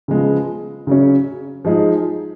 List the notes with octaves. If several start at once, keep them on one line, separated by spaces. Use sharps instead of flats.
C#3 F3 G#3 B3
C#3 F#3 C#4
F3 G#3 D#4 G#4